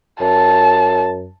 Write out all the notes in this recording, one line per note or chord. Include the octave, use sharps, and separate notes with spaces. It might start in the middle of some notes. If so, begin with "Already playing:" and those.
F#2 A5